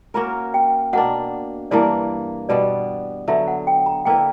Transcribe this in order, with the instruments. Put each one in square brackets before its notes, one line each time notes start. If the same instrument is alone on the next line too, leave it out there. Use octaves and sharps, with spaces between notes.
[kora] A#3 C#4 F#4 A#4 [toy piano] A#5
[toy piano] G5
[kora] B2 A#3 D4 [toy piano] F#5
[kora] G2 E3 A#3 D4 [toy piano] D5
[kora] B2 G3 B3 [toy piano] D5
[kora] D3 F#3 B3 [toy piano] E5
[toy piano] F#5
G5
A#5
[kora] D3 A#3 E4 B4 [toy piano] G5